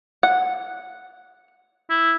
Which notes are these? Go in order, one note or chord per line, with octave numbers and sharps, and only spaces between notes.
F#5
E4